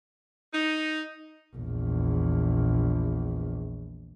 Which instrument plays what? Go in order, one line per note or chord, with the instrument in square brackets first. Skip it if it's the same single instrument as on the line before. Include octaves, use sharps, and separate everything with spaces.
[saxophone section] D#4
[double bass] A#1 E2